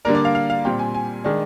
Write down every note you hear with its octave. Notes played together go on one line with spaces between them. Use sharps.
D3 G3 A#3 D4 A#4
D5
F5
F5
F5
A#2 G3 C4 G5
G#5
G#5
D#3 G#3 D4